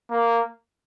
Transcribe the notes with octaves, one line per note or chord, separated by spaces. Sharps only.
A#3